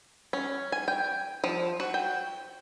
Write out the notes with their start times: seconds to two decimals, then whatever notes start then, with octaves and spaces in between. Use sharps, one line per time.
0.33 C#4
0.72 G#5
0.88 G5
1.44 F3
1.80 F#4
1.94 G5